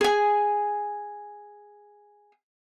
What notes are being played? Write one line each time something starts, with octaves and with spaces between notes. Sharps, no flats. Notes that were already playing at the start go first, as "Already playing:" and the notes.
G#4 G#5